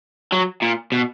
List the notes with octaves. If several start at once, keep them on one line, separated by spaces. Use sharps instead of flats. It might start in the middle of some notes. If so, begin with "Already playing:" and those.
F#3
A#2
B2